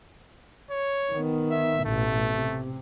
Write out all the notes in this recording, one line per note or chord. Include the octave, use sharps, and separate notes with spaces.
C#5
D#3 B3
E5
A1 B2 A3
C3